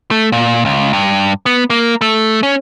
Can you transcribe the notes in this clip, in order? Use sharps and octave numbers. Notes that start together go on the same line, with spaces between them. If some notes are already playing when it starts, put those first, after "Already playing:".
A3
A#2
C#2
G2
B3
A#3
A3
C#4